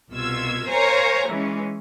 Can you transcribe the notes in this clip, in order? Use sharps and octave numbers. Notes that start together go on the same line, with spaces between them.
C2 B2 F4 E6 G#6
A#4 C5 C#5 F5 G#5 A#5
E3 G#3 C#4